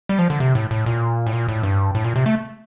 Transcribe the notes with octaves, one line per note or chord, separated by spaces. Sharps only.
G3
F3
D3
C3
A2
A2
A#2
A2
A#2
A2
G2
A2
A#2
C3
A3